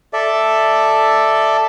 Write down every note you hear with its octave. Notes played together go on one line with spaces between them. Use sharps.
A4 D5 E5